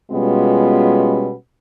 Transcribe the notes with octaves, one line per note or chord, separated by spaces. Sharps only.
B2 G3 G#3 B3 C#4 F4